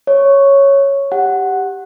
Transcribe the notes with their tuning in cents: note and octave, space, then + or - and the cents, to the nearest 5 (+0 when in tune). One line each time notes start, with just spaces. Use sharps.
C#5 +0 C#6 +0
G4 +0 F#5 +0